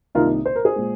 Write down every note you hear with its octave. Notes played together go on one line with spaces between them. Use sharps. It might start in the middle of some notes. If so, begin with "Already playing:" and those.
C2 C3 D#3 A#3 D#4 F4 A#4
C5
A#4
G#4 C5
A#2 G#3